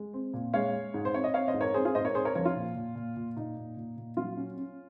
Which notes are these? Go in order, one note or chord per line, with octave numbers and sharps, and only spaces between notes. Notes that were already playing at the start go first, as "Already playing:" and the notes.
Already playing: G#3
C4
A#2
G#3 C#5 F5
G#3
G#2
C5
C4 C#5
D#5
C4 C#5 F5
C5 D#5
G#2
A#4 C#5
C4 G#4 C5
F4 G#4
G#2 C5 D#5
A#4 C#5
C4 G#4 C5
A#4 C#5
F3 A#4 C#5
F4
A#2
A#2
A#2
A#2
A#2 D#4
A#2
A#2
A#2
F#3 F4
C#4
C#4